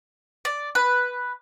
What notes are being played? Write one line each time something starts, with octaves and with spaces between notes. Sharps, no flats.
D5
B4